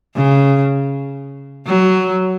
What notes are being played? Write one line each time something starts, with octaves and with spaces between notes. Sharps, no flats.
C#3
F#3